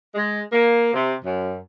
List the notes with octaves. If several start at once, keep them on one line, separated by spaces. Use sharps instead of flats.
G#3
A#3
C3
F#2